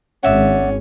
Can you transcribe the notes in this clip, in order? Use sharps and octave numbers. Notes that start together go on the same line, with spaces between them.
G#1 C#4 D5 E5 F#5